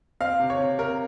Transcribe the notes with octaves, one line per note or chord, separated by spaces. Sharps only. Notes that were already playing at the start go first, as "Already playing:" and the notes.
C4 F5
C3
C#5
C3
C3 A#4